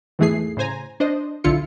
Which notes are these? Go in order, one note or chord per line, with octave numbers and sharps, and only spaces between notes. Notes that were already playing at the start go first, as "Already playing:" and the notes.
E2 G#2 E3 A3 G#4 C7
A2 C#3 C5 G#5 A#5
D4 C5 D#5
B1 D3 E4 F4 C#7